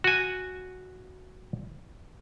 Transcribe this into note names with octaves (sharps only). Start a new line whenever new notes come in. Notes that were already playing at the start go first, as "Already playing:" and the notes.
F#4 G#5